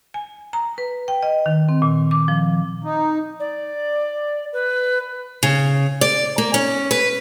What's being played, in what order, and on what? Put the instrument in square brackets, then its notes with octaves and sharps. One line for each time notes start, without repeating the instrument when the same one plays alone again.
[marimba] G#5
A#5
B4
G5
D#5
D#3
C4
A#2
D6
F3
[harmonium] D#4
[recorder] D5
B4
[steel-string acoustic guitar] C#3
D5
A#3
C#4
B4